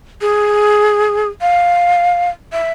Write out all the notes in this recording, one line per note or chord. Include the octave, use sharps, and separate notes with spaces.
G#4
F5
E5